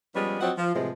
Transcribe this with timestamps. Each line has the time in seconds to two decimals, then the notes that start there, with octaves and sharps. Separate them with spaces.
0.14 F3 G3 G#3 B3 C#4
0.40 F3 F#3 C4 D#5 F#5
0.56 F3
0.73 A2 C3 E3 F3 G#3